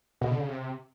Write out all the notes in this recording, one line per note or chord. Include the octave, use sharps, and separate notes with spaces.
B2
D3
C#3
C3